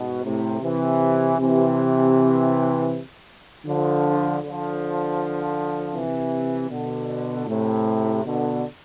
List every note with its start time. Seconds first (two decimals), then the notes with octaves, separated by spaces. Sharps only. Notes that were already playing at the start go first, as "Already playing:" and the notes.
Already playing: G#2 B2
0.23 A2 C3
0.61 C3 E3
1.38 C3 E3
3.65 D3 F3
4.42 D3 F3
5.94 C3 E3
6.70 B2 D3
7.47 A2 C3
8.23 B2 D3